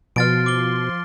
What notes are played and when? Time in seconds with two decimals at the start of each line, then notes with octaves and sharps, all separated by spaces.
0.16 B2 F3 C6 F6 A6 D7
0.46 D6 G7